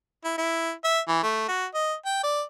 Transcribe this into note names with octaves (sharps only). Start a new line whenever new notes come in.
E4
E4
E5
E3
A3
F#4
D#5
G5
D5